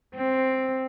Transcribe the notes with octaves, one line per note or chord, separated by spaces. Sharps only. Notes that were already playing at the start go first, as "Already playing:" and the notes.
C4